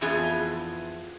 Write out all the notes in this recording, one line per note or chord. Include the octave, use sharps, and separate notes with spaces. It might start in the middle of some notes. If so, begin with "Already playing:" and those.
F2 E3 B3 F4 G#4